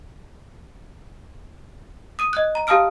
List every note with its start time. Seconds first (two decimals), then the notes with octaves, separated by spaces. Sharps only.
2.19 D#6 D#7
2.33 D#5 F#6
2.55 A#5
2.67 G4 F5 A5 D#6 F6 D7